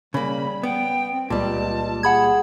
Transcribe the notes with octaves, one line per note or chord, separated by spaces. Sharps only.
C#3 G3 A#3 B5
B3 G5
C4
C#2 A#2 G3 A5
G#4 F#5 B5 G#6